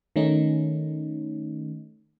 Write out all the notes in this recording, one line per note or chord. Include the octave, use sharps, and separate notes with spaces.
D#3 A3 C#4 D#4